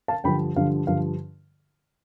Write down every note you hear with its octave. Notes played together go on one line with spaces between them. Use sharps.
F5 A5
G2 D3 F3 G5 B5
G2 D3 F3 F5
G2 D3 F3 F5